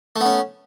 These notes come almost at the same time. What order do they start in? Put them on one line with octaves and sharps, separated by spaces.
A3 B3 C#4